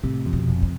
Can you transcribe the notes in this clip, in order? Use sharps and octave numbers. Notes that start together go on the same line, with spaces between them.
A2 C3
F2
B2
F1
C3